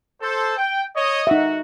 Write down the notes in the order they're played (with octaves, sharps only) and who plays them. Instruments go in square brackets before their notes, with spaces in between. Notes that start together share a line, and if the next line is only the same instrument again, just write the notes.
[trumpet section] A4 C5
G5
C#5 D#5
[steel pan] D#4 E5 [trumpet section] F#4